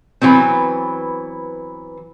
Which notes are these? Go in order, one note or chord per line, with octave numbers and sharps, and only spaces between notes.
E3 F#3 B3 C4